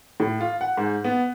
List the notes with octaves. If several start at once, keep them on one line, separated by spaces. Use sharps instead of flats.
A2
F4
F#5
G#2
B3